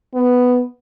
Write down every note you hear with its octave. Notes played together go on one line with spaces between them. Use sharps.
B3